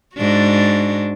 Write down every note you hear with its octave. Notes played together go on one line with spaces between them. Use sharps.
G#2 D4 F#4